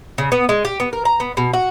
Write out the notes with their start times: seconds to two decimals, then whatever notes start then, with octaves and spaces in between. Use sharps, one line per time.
0.18 C#3
0.32 B3
0.49 G#3
0.65 G4
0.80 B3
0.93 A#4
1.05 A#5
1.20 B3
1.37 B2
1.53 F#4